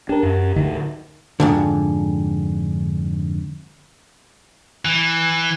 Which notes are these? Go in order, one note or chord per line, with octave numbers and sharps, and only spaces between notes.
D4 G4 A#4
F#2
D2 A2 D3 D#4
F2 G#2 D3
E3